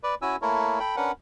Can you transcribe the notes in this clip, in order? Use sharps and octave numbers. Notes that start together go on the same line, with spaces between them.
B4 D5
C#4 E4 F#4 G#5 E6
A3 A#3 E4 A4 A#4 C#5
A4 G5 B5
C#4 D4 A#4 B4 F#5